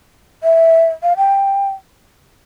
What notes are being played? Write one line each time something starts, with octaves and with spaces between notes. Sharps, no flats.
E5
F5
G5